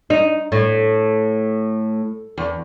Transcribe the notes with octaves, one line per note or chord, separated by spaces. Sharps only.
D#4
A2
E2